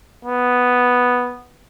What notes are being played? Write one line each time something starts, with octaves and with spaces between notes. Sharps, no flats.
B3